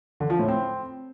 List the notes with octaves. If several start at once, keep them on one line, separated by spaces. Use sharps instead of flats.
D3
F3
A2
C4